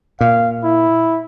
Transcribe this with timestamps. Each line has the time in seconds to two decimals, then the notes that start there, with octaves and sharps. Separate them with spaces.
0.21 A#2 F5
0.64 E4